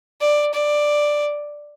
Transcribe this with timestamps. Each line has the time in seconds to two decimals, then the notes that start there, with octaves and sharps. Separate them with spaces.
0.20 D5
0.53 D5